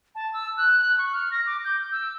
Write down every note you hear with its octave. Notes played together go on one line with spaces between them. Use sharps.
A5
E6
F#6
F#6
C#6
F6
A#6
D6
G6
E6